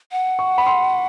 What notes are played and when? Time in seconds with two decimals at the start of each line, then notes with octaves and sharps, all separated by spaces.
0.12 F#5
0.39 C#6
0.58 B5
0.67 C6